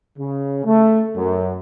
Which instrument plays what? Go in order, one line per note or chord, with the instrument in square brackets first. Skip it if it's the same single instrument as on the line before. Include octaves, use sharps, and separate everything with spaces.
[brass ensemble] C#3
A3
F#2